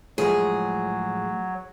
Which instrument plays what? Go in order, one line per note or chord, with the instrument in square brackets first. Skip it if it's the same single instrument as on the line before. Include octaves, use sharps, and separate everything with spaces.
[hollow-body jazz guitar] A2 F3 G#3 [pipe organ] F#3 [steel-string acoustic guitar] G#4